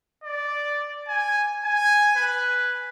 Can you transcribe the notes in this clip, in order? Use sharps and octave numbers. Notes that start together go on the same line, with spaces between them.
D5
G#5
G#5
B4